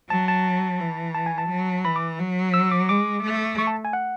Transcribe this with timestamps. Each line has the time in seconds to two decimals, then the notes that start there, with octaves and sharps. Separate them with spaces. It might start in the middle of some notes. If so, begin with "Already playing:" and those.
0.10 F#3 A5
0.28 A5
0.80 E3
1.15 A5
1.26 G#5
1.38 A5
1.49 F#3
1.84 E3 B5
1.96 D6
2.19 F#3
2.54 E6
2.72 D6
2.89 G#3 D6
3.23 A3
3.59 C#6
3.67 A5
3.85 G#5
3.93 F#5